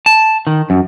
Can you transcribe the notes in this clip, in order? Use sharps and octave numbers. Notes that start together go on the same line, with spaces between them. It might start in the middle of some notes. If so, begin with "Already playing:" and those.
A5
D#3
F#2